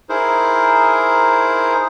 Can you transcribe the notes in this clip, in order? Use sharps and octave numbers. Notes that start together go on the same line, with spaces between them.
D#4 E4 G#4 A#4 C5